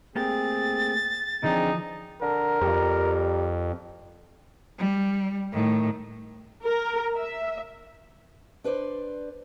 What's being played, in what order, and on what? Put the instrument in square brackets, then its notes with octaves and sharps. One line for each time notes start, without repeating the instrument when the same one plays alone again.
[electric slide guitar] A3 A#3 G4 [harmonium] C4 G#4 [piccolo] A6
[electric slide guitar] D3 E3 F3 [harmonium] C4 D4 G#4 [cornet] D#4
[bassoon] D3 [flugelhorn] A#4
[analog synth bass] F2 [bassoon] G3
[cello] G3
A2 D#3
[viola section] A#4
E5
[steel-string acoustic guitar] D4 B4 C5 D5